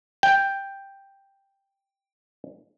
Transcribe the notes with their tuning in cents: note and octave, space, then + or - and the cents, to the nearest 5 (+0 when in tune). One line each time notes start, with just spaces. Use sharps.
G5 +5